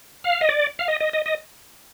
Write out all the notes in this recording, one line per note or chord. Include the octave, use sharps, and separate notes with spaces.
F5
D#5
D5
F5
D#5
D#5
D#5
D#5